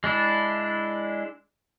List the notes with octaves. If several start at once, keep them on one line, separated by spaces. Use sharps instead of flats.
G#3 D4 E4